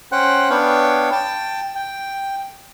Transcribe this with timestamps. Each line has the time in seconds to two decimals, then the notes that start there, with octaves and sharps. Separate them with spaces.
0.12 C#4 C5 F#5 G5 F#6
0.50 B3 D4 C#5 F5 G5
1.12 G5 A5
1.75 G5